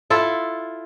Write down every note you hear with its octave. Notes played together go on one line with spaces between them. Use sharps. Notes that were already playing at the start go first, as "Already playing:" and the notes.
E4 F4 A4